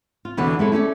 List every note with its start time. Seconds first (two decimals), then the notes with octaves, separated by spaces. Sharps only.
0.25 F4
0.37 E2 B2 D3 E3
0.59 G#3 E4 A4 C#5
0.72 A3 C#4 A4 D5